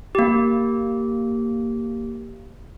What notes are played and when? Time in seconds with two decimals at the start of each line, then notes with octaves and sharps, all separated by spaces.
0.15 A#3 G4